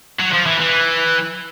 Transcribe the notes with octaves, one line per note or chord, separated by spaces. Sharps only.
F#3
F3
E3
E3